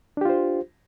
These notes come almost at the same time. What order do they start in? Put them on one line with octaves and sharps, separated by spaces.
D4 G4 F4 C5